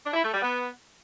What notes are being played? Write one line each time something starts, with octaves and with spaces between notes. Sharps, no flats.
D4
E4
A3
G3
B3